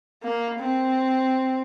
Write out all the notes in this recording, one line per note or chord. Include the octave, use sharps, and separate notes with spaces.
A#3
C4